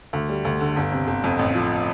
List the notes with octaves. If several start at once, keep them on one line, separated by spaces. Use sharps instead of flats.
D2
G3
D2
D3
G1
C3
G1
F2
A1
F3